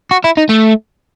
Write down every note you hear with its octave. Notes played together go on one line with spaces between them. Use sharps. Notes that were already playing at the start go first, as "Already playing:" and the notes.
F#4
E4
D#4
A3